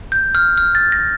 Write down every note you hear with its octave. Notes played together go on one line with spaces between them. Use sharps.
G6
F6
F6
A6
A#6